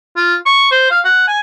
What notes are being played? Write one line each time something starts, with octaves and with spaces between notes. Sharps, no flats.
F4
C#6
C5
F5
F#5
G#5